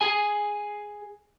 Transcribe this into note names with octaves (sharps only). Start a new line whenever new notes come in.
G#4 G#5